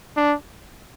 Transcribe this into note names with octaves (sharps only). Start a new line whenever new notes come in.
D4